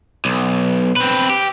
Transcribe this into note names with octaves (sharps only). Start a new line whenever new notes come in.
B1
C4 B4
G4